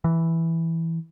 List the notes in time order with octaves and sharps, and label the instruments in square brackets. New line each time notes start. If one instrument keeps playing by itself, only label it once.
[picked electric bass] E3